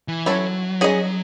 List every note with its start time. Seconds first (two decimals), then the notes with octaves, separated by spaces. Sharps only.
0.08 E3
0.26 F#3 C#4 E4 A4 C#5
0.81 C#4 G#4 D#5